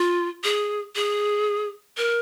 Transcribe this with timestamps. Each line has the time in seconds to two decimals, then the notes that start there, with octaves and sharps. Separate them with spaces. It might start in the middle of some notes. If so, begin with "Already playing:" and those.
Already playing: F4
0.44 G#4
0.96 G#4
1.97 A#4